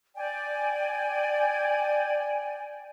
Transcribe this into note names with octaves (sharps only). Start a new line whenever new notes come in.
D5 G5 G#5